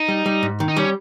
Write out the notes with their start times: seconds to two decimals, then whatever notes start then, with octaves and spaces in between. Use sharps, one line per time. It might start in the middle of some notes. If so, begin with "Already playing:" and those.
Already playing: D#4
0.08 G3
0.26 G3
0.43 G#2
0.60 D#3
0.68 D#4
0.77 G3 C#4